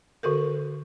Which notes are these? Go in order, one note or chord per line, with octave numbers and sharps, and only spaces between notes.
D3 F#4 A4 A#4